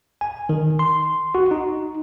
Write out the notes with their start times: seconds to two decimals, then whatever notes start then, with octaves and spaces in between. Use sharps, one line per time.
0.21 G#5
0.49 D#3
0.79 C6
1.35 F#4
1.51 D#4